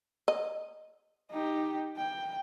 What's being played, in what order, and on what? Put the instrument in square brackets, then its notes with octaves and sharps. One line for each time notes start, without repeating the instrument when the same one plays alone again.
[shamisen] D#5
[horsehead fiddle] D#4 G4
G5